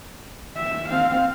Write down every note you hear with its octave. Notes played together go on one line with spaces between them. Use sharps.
E5
C4 F5